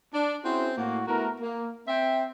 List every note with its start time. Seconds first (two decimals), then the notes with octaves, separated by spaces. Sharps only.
0.14 D4
0.45 C4 C#4 E4 F#4 G#4 C5
0.78 A2 A#3 F#4
1.08 A3 B3 E4 F#4 A#4
1.41 A#3
1.88 C4 E5 G5